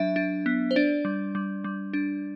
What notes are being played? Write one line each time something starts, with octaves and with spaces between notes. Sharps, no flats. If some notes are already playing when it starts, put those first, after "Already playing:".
Already playing: F#3 D4 E5
D4
B3
C5
D4 D5
G3
G3
G3
D4